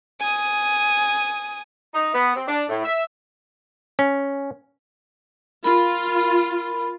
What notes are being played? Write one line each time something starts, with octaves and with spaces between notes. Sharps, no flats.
G#5 D#6
D#4
B3
C4
D4
A2
E5
C#4
F4 A#4 B5